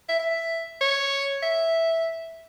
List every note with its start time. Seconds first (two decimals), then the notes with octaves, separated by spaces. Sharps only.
0.09 E5
0.19 E5
0.81 C#5
1.42 E5